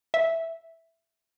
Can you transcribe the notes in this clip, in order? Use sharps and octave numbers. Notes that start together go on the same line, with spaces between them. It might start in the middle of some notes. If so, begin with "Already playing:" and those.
E5